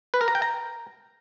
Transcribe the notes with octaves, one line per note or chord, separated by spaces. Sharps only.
B4
A#4
A#5
G5
A#5